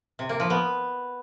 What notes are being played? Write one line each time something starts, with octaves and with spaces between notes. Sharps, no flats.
C3
A#3
F3
B3